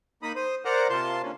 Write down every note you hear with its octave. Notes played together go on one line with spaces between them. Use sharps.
A#3 D#4 B5 D#6
C5 D#6
A#4 C5 D5 F#5 A#5
C3 A#3 F4 A5 C6
D3 A#3 C#4